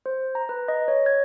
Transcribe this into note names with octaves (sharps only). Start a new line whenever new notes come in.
C5
A#5
B4
D#5
C#5
G#6